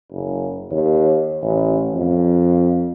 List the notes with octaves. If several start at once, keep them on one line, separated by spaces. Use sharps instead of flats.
F#1
D#2
A1
F2